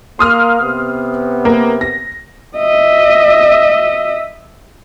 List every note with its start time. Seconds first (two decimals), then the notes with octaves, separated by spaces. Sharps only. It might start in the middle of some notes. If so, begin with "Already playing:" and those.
0.19 A#3 C6 D#6 F6
0.62 C3 B3
1.45 A#3
1.81 A#6
2.56 D#5 E5